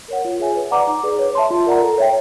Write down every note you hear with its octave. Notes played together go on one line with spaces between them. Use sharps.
A#4 C#5 F#5
F4
G#4 C#5 E5 G#5
B4
D5 F#5 A#5 D6
D#4
G#4 B4 D5
C#5
E5 A5 C6
F4
A#4 D5 F#5 A#5
A4
C#5 E5 G5